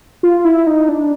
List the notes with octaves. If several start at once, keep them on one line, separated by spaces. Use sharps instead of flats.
F4
E4
D#4
D4